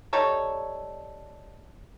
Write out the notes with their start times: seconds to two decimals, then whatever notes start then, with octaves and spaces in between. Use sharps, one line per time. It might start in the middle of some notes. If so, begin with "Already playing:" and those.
0.13 G3 D#4 A4 C#5